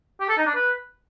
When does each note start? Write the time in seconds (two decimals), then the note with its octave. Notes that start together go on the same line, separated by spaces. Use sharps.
0.20 G4
0.29 A4
0.37 D#4
0.46 D4
0.55 B4